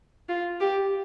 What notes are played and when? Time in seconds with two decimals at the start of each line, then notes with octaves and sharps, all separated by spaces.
0.29 F4
0.60 G4